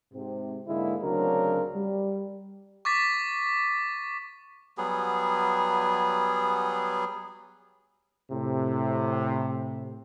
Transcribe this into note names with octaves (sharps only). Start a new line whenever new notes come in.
G#2 C3
G#2 D3 G#3 A#3 E4
D2 C#3 F#3 C4 D4 A#4
G3
C#6 D6 A6 B6
F#3 G3 B3 G#4
A2 C3